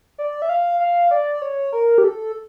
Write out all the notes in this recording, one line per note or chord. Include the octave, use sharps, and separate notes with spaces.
D5
E5
F5
F5
D5
C#5
A#4
G4
A4